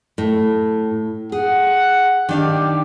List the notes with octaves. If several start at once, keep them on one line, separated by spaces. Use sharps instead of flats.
A2
G#4 F#5
D#3 D4 G4 F5